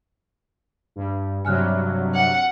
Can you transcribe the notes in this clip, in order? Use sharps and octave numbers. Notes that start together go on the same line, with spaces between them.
G2
G2 C3 F#3 G#5 F6 F#6
F#5